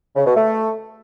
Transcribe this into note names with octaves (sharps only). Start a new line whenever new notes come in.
C#3
B2
A3